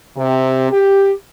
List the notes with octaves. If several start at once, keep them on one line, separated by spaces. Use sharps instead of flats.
C3
G4